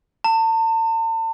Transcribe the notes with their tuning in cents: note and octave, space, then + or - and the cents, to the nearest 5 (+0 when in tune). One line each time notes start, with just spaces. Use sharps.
A5 +40